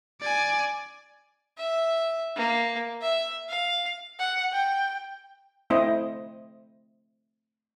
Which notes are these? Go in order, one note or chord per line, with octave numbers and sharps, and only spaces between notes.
D5 G#5
E5
A#3
E5
F5
F#5
G5
A3 C4 E4 C5 D#5